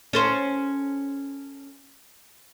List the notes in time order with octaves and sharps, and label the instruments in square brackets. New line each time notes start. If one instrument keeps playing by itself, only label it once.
[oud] C#4 A4 C5